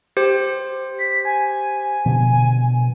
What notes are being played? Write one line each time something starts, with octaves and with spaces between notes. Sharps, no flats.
G4 C5
B6
G#5
B2 D3 F3